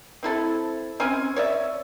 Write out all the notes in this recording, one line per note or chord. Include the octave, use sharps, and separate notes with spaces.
C4 E4 A4
C4 C#4 G#5
C#5 D5 E5